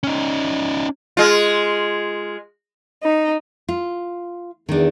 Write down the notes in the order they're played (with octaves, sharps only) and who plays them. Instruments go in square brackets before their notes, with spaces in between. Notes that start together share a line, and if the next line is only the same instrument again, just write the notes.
[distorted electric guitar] C#4 D#4
[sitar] G#3 F4
[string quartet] D#4
[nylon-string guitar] F4
[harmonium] E2 [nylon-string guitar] D#3 D4